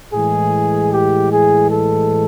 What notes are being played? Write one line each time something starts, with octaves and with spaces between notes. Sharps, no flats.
A2 E3 G#3 G#4
G4
G#4
A4